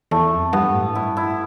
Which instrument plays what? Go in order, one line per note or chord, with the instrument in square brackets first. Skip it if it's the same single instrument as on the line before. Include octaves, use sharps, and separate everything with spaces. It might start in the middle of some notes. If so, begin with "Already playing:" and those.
[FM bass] E2 [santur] A3
[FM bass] F2
[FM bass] G2 [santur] B3
[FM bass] A2
[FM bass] G2 [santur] E4
[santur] E4